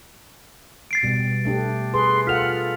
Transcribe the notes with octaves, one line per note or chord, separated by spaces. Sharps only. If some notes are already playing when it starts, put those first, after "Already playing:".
A6 C7 D7
B2 G3
A3 D4 G4
G#4 B4 C6
F4 A4 F#5 F6 B6 F7